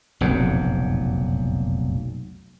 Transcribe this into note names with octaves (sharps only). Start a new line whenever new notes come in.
F1 B1 F#2 A#2